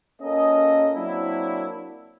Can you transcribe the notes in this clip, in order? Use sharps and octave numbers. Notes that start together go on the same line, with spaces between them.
A#3 C#4 F4 A4 A#4 D#5
F#3 A#3 C4 D4 E4